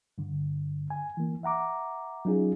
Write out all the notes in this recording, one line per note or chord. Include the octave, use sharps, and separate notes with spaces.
G2 D3
G#5
E3 A#3
E5 F#5 A#5 D6
F#3 C#4 D#4 F4 G#4